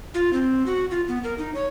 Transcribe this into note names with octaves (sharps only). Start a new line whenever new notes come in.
F4
C4
F#4
F4
B3
A#4
D#4
C#5